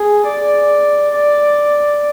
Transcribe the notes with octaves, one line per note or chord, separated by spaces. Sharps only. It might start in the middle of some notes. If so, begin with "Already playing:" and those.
Already playing: G#4
D5
D5